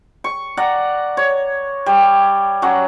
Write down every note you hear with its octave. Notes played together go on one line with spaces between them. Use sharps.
C#6
D5 F#5 A#5
C#5
G3
F#3 C#4 F#5